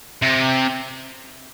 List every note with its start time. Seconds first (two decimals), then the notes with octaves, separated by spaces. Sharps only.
0.22 C3